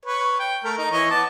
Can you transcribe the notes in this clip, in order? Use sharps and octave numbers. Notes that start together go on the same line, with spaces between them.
B4 C#5
G5
A3 A#4
D#4 A#5
E3 C#5 D#5
B3 A5 D6